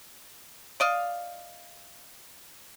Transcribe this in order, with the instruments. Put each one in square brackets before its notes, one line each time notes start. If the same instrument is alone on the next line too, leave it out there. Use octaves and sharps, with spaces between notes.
[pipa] D5 D#5 F5